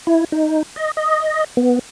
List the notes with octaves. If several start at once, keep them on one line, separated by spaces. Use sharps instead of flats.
E4
D#4
D#5
D#5
B3